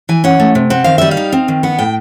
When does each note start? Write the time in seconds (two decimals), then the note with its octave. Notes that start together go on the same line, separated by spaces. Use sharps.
0.09 E3 G#5
0.24 C#4 F#5
0.40 A3
0.55 C3
0.70 C4 F#5
0.84 D#3 F5
0.98 G3 E5
1.11 F5
1.17 D#4
1.32 C4
1.48 D#3
1.63 B3 F#5
1.79 A2 G5